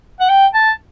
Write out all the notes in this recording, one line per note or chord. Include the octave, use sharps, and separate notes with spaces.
F#5
G5
A5